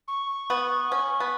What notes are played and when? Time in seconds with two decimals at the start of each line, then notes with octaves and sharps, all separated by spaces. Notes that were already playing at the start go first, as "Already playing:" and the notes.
0.08 C#6
0.50 B3
0.92 C#4
1.20 B3